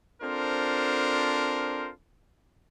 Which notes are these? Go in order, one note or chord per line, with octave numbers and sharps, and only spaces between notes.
C4 D4 F4 A4 A#4 C5